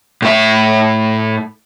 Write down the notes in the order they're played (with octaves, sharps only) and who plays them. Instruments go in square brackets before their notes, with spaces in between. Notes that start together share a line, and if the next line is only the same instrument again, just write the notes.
[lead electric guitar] A2 E5